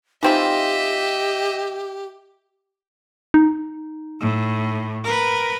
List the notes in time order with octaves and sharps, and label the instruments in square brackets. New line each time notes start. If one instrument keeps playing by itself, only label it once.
[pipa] E3 C4 F4 [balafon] D#4 G5 [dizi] G4 [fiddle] D#5 E5
[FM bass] D#4
[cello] A2
A#4 B4